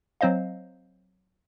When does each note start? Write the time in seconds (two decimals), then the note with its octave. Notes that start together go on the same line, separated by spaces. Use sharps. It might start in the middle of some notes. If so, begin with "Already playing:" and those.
0.21 F#3 C4 C5 D#5 F5